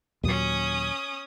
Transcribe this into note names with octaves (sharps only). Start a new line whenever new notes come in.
D#2 A#2 F#3 C#4 D#6